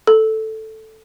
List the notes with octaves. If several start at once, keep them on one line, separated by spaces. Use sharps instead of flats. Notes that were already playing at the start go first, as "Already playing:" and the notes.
A4